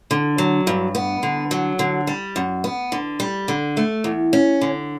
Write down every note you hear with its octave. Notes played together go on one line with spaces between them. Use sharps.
D3
F#3
G2
B3
D3
F#3
D3
G3
F#2
B3
D3
G3
D3
A3
E2
C#4
D3